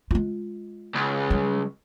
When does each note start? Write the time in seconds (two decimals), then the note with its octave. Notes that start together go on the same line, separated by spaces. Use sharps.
0.11 G#3 F4
0.95 C#2
1.30 F#3 G3